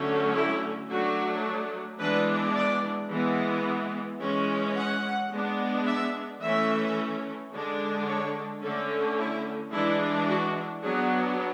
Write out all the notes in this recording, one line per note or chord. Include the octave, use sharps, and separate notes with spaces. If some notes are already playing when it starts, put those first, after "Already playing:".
Already playing: D3 F#3 A3 C#4
E4
F#3 A3 D4 F#4
E3 G#3 B3 D4 B4
D5
E3 G#3 B3
E3 G#3 C#4
F#5
G#3 B3 D4
E5
E3 A3 C#4 E5
D3 G#3 D4
C#5
D3 A3 C#4 A4
E4
E3 G#3 D4 E4
F#4
F#3 B3 D4 G#4